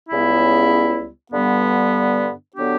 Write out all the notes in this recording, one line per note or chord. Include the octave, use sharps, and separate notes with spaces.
C#2 C#3 G3 B3 E4
G2 D3 G3 B3
D3 F#3 B3 D4 G4